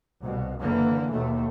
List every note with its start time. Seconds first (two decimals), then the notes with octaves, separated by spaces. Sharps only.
0.21 C2 B2
0.60 F#1 D3 E3 A#3
1.11 D#2 B2 A3